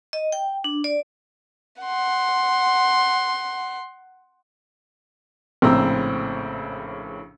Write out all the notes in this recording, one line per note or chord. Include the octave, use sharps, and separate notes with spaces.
D#5
G5
D4
D5
F#5 C6
A#1 A2 C#3 C4 A#5 E6